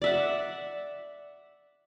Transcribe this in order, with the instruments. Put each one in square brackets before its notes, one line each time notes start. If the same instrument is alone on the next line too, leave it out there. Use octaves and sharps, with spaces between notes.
[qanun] D5 E5 F#5